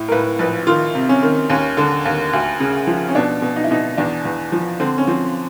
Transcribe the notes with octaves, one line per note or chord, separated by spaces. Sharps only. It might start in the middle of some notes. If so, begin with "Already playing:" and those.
Already playing: A2
A#4
A2 B4
A#1 B4
D#3 F4
C3
C#4
D#3
D#2 C#4
D3
D#2
D2
C#3
F3
C#4
B2 D4
B2
D#4
E4
B2 D#4
E2 D4
E2
F3
D3 C4
C#4
F3 C4